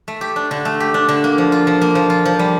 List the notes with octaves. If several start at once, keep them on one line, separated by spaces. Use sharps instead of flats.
A3
G4
D4
D3
A3
G4
D4
D3
A#3
F3
F4
F3
A#3
F3
F4
F3
G3